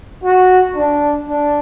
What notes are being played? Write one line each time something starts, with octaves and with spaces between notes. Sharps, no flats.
F#4
D4
D4